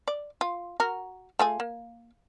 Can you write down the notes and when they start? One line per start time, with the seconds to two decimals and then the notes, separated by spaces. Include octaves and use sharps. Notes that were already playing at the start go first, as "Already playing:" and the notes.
0.08 D5
0.41 F4
0.80 F#4 A#4
1.39 A3 F4 G#4
1.60 A#3